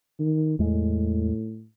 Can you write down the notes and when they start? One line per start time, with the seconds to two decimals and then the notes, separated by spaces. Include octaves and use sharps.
0.20 D#3
0.59 E2 A2 G#3